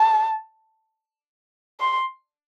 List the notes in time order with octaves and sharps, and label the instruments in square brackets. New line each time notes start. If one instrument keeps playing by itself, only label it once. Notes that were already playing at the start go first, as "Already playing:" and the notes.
Already playing: [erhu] A5
C6